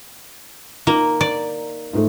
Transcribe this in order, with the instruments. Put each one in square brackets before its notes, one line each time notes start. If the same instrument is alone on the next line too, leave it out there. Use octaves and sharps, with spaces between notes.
[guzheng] A#3 [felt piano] D#4
[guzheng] D5
[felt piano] G#2 A3